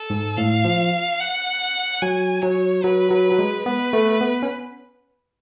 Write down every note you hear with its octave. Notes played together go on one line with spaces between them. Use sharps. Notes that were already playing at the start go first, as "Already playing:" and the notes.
Already playing: A4
G#2
A2 F5
F3
F#5
F#3 G#5
F#3 C#5
F#3 B4
F#3
F#3
G#3
B3 B4
A3
B3
C#4